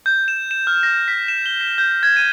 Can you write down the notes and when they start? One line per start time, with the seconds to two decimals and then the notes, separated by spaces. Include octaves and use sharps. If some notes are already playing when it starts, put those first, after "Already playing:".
0.06 G6
0.28 E7
0.51 E7
0.67 F6
0.83 A#6
1.08 B6
1.28 E7
1.46 G7
1.61 B6
1.78 G6
2.03 G#6
2.16 D#7